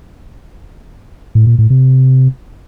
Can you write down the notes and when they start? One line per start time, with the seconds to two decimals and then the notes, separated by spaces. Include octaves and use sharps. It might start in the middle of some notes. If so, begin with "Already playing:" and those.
1.35 A2
1.47 A#2
1.58 A2
1.70 C3